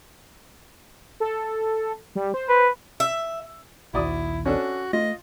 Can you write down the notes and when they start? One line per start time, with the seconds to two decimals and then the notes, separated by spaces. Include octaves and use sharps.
1.20 A4
2.15 G3
2.34 C5
2.49 B4
3.00 E5
3.94 A#1 D#2 E4 F#4 D5 D#6
4.46 C#4 D4 F#4 A4
4.93 A3 F4 D#5